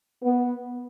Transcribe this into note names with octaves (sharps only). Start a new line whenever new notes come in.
B3